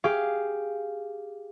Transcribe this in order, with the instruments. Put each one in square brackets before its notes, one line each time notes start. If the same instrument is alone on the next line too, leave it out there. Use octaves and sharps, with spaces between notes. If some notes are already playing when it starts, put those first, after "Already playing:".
[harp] G4 G#4 F5